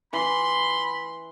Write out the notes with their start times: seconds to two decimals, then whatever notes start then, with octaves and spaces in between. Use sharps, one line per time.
0.13 E3 B5 C6